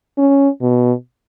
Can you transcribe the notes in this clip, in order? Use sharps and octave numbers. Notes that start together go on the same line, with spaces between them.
C#4
B2